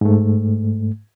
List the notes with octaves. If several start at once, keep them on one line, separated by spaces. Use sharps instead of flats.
G#2 A3